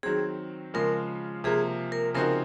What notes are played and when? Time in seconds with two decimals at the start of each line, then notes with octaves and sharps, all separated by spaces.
0.03 D#3 F#3 C4 G#4
0.74 C#3 F3 G#3 A#4
1.44 C3 F3 A#3 G#4
1.92 A#4
2.14 C#3 F3 C4 D#4 F#4 A#4